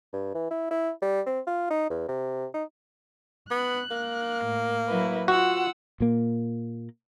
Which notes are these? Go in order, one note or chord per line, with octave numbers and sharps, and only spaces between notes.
G2
E3
E4
E4
G3
C4
F4
D#4
E2
C3
D#4
B3 F#6
A#3
A2
F#3 E4 B4
F4 F#4 F#5 E6
A#2 A#3